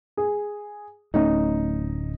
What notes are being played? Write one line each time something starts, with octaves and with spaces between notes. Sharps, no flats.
G#4
D1 A3 C#4 D#4